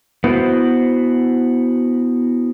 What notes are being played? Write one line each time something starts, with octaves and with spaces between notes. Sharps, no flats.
B3 E4 F#4 B4 C5